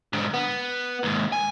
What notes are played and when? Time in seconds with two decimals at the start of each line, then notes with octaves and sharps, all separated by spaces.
0.13 G#2 D3
0.34 B3
1.03 D#2 G#2
1.32 G#5